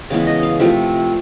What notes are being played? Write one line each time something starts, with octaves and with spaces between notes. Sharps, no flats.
C#3 E3 G#3 B3 A5
D#5
F5
C3 F3 A3 E5